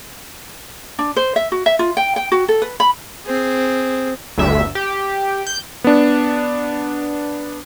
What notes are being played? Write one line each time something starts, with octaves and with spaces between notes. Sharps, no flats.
D4
C5
E5
F#4
E5
F4
G5
G5
F#4
A4
B4
B5
C4 G#4
G1 D2 E5
G4
G6
B3 D4